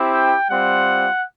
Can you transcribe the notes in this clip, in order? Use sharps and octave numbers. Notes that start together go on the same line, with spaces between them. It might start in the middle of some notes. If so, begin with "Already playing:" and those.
Already playing: C4 E4 G4
G5
G3 C4 F4 F#5